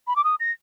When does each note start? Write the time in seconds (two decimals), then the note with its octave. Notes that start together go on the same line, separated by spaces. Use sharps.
0.07 B5
0.16 D6
0.24 D#6
0.40 A#6